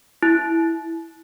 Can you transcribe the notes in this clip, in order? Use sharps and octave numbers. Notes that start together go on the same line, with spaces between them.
E4